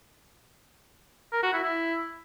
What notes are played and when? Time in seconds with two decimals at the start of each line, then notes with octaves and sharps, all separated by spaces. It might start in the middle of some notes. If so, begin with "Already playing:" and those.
1.32 A#4
1.43 F#4
1.53 E4
1.63 E4